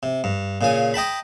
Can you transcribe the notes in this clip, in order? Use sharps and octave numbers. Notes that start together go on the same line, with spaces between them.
C3
G2
A#2 C#3 G#5
D#5 G5 A5 B5